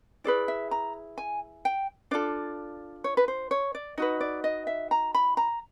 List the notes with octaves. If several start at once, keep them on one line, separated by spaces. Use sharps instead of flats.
E4 G#4 B4 D5
E5
A#5
G#5
G5
D4 F4 A4 D5
C#5
B4
C5
C#5
D5
D#4 F#4 B4 D#5
D5
D#5
E5
A#5
B5
A#5